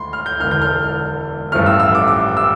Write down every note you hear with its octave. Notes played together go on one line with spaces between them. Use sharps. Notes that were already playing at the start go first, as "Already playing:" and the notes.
Already playing: D2 D3 A3 B5 C6
F6
G6
E1 E2 D3 F6
G6
F6
A1 G2 F3 A3 F6
E6
E6
D6
D6
E6